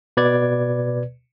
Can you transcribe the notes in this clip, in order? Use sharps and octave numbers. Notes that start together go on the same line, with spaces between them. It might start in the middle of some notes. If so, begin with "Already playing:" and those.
B2 B4 D5 G#6